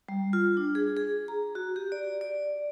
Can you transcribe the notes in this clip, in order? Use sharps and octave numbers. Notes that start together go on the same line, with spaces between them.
G3
F4
D4
G#4
G#4
A#5
F#4
G4
D5
D5